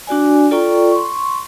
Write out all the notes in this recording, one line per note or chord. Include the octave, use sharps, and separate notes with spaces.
D4 F#4 D5 G#5
F4 A4 D5 G5 A#5 C#6
C6 C#6